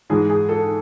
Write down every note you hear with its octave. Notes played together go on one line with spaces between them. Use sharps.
G#2 E3 G#3 G#4
G#4
A4